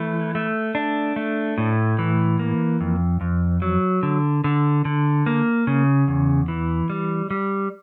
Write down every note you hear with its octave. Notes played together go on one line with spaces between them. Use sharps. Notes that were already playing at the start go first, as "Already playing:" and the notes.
Already playing: E3 A3
A3
D4
A3
A2
E3
A#3
F2
F2
F#3
D3
D3
D3
A#3
C#3
E2
E3
G3
G3